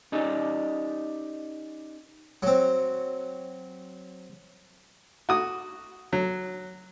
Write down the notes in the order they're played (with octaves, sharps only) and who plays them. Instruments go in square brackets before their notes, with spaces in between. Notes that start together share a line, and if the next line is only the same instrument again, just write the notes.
[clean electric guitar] C#4 D#4 G4 D5 D#5
[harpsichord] F#3 C4
[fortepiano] F#4 D#6
F#3